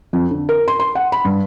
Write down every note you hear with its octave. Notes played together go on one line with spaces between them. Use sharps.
F2
D3
A#4
C6
C6
F#5
B5
G2